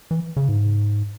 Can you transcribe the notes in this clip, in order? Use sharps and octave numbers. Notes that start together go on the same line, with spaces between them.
E3
C#3
G#2